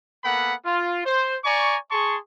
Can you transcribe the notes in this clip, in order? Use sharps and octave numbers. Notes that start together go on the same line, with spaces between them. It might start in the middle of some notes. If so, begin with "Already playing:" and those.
A#3 B3 A4 F#5 B5
F4
C5
D5 G#5 A#5 C#6
G#4 A5 C6 C#6